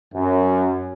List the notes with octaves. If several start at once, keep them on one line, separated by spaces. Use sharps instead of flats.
F#2